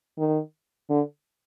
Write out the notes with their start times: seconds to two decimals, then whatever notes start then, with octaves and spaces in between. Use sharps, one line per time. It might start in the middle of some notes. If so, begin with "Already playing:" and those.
0.18 D#3
0.90 D3